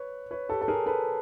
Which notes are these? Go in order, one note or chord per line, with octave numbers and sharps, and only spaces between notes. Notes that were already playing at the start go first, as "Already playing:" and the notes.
Already playing: B4 C#5
B4 C#5
G4 A4
A4
G#4 A#4
A4 B4